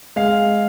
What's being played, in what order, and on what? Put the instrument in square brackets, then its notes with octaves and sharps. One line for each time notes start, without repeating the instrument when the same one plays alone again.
[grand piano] G#3 F5